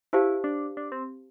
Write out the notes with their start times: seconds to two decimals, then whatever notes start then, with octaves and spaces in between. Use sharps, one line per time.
0.13 E4 G4 C5 F5 A5
0.44 D4
0.77 D4
0.92 C4